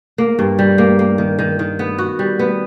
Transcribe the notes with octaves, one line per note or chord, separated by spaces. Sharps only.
A#3
G2
G3
A#3
A#3
D#3
D#3
D#3
B3
F#4
G3
B3